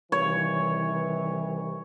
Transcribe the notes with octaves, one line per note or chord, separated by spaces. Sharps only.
C2 D#3 E3 C#5